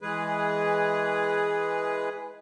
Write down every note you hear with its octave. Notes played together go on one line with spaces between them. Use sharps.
E3 G#3 G#4 B4